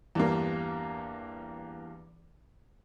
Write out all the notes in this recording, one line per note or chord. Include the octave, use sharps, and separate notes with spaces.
E2 G2 A#3